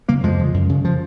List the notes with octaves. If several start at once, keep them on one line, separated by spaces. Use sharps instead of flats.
C#3 F#3 A#3
F2 F3 G#3
C#3
F#2
C#3
F3